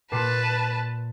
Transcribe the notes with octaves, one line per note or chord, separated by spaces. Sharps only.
A#2 B4 A5 C7